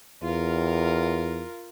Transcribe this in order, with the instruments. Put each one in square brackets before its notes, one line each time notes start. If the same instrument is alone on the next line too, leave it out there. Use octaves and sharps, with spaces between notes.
[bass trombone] E2 [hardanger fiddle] F4 A#4